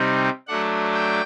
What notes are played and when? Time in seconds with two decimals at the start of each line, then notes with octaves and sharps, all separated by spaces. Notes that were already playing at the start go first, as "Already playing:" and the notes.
Already playing: C3 G3 C4 D#4
0.47 F#3 A3 D4 F#5
0.94 G5